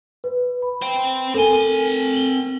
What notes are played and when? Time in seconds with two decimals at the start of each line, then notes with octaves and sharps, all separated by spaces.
0.24 B4
0.62 B5
0.82 C5 G5
1.34 C4 A4 A#4 G#5 G7
2.14 F#7 G7